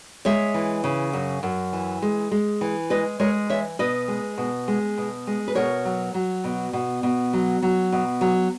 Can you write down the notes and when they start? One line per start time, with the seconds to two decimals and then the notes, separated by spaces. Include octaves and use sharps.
0.25 G#3 C#5 E5
0.54 E3
0.84 C#3
1.13 F#2
1.43 F#2
1.73 E3
2.02 G#3
2.31 G#3
2.61 E3
2.90 G#3 B4 D#5
3.19 G#3 A#4 C#5
3.50 E3 C#5 E5
3.79 B2 B4 D#5
4.08 G#3
4.38 B2
4.68 G#3
4.98 B2
5.27 G#3
5.48 B4
5.55 B2 A#4 C#5
5.85 F#3
6.14 F#3
6.44 B2
6.73 B2
7.03 B2
7.33 F#3
7.62 F#3
7.92 B2
8.21 F#3